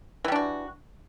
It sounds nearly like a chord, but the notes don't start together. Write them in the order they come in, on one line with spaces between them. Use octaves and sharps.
E3 G3 D4 F#4